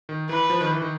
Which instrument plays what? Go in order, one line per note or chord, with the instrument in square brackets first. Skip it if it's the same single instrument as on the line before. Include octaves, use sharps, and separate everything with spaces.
[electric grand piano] D#3
[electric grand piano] E3 [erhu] B4
[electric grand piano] F3
D#3
E3
D#3